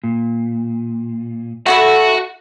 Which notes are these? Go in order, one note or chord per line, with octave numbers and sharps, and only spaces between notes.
A#2
A3 D4 E4 F#4 F#5